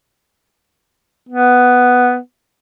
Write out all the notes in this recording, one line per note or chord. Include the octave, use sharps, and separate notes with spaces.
B3